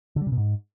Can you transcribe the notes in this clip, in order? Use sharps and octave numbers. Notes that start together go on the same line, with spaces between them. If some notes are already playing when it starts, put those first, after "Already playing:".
D3
G3
C#3
B2
G#2